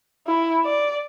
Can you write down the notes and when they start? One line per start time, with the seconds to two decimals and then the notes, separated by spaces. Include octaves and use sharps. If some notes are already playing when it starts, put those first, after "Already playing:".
0.27 E4
0.65 D5